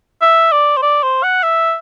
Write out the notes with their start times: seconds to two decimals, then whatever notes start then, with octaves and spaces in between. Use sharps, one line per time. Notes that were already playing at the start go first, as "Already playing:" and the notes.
0.22 E5
0.52 D5
0.77 C5
0.82 D5
1.03 C5
1.23 F#5
1.43 E5